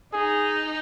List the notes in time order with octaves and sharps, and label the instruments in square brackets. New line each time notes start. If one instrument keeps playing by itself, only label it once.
[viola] D#4 [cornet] G#4